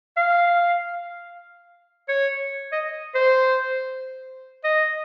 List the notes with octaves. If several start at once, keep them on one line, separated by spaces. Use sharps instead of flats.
F5
C#5
D#5
C5
D#5